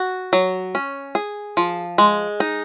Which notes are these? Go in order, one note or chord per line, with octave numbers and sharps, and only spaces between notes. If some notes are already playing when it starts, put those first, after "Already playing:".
Already playing: F#4
F#3
C#4
G#4
F3
G#3
D#4